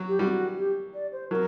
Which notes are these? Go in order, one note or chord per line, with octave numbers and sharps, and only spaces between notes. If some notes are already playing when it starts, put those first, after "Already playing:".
Already playing: F#3
G4
G3 F#4
G4
D5
C5
F#3 A#4